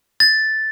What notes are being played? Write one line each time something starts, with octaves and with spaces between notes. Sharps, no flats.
A6